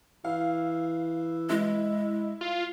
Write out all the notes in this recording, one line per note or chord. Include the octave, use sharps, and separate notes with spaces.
E3 F5
G#3 E4
F4